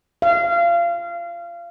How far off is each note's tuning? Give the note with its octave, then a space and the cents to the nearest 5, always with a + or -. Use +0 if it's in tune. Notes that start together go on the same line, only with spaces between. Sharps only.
F5 -25